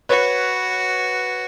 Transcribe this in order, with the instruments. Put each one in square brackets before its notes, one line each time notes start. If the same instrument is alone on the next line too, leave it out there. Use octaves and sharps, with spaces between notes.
[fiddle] F#4 [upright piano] B4 C#5